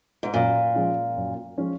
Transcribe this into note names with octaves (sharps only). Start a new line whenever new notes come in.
G#2
F#2 A#2
F3 G#3 C#4 F4
F#2
F3 G#3 C#4 F4